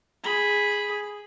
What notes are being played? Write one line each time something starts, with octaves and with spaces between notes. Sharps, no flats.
G#4 B5